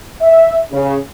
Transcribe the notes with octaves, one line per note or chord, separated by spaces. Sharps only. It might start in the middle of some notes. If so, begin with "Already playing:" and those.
E5
C#3